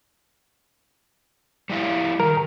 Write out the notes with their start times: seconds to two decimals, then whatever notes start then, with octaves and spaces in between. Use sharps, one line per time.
1.70 G3 E4 F5
2.20 D#3 F3 A#4